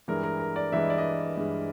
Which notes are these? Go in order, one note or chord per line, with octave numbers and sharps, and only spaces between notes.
G2 E3 G#3 A#4
A#4
A#4
D5
G2 E3 G#3 E5
D#5
D5
D#5
G2 E3 G#3